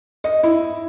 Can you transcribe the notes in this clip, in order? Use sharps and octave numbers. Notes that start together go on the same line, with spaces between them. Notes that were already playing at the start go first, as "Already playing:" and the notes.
D#5
E4